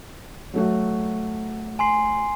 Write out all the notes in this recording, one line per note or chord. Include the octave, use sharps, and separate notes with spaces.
F#3 A3 F#4
G#5 C6 C7